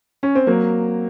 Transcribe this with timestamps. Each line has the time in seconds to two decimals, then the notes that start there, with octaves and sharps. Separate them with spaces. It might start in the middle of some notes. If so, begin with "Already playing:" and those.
0.23 C#4
0.35 C4
0.47 F#3 A#3